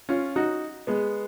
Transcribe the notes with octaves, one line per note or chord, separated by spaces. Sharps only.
C#4 F4
D#4 F#4
G#3 B3